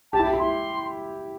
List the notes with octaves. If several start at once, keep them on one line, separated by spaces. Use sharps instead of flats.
G4 A5
E4
E4
C6